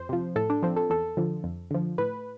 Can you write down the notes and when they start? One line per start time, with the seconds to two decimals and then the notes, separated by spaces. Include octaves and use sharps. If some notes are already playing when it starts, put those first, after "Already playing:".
Already playing: F2 C5
0.09 C3 F3
0.36 A2 A4
0.50 D4
0.63 F3 C4
0.76 A4
0.90 E2 A4
1.17 D3 F3
1.44 F2
1.71 D3 F3
1.98 A2 B4